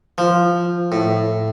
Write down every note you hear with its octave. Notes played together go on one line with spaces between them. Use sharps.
F3
A2